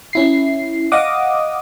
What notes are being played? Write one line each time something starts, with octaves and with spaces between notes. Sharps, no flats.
C#4 E4 C7
D#5 F5 F#5 D6 D#6